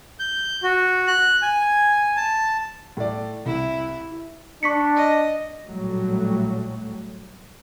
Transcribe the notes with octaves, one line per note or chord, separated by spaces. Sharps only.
G6
F#4
F#6
G#5
A5
A2 D5
C2 E4
D4 C#6 B6 C#7
D#5
A#1 A2 F#3 G3 A3